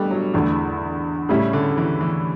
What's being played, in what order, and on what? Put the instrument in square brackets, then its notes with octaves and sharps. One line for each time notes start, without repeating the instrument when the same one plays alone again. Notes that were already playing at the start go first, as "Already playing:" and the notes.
Already playing: [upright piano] A1 G2 D3 [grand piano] G3 A3 B3
[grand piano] F#3
[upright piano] E2 D3 A3 [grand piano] E3
[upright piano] A2 G3 C#4 E4 [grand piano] C#3
[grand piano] D3
E3
E3